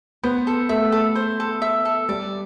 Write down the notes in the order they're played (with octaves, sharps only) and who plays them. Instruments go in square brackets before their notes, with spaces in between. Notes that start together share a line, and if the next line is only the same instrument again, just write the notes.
[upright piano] B3 [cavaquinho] C5
[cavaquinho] A4
[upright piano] A3 [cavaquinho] E5
[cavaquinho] A4
C5
A4
E5
A4
[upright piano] G3 [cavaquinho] D5